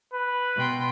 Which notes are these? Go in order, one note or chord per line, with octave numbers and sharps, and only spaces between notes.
B4
B2 G5 C6